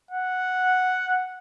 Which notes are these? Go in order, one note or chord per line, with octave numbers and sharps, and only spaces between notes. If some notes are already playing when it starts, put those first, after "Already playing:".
F#5